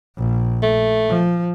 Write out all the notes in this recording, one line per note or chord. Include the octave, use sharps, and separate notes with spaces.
A#1
A3
F3